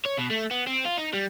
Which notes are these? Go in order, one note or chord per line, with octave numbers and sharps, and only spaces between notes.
C#5
B2
A3
B3
C4
F4
D#4
G3